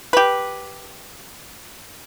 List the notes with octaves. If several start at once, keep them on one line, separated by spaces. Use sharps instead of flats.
G4 B4